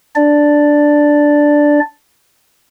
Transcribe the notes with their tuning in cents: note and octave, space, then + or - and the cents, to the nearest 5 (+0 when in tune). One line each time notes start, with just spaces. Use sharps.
D4 +0 D5 +0